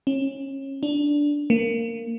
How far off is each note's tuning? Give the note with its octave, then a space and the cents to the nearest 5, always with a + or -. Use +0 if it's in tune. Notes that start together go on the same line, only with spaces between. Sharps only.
C#4 -25
D4 -5
A#3 -15